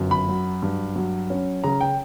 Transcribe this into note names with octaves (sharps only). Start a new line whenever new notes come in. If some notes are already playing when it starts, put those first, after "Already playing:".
Already playing: G1 F#2
B5
F#3
G2
F#3
C#4
C#3 A#5
G5